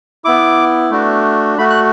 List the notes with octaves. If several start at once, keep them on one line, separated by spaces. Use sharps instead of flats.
B3 E4 D6
A3 D4 F#4
A3 F#4 B5
F#6